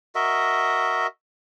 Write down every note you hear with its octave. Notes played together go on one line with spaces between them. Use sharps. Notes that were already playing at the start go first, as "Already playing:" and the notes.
F#4 A#4 D#5 E5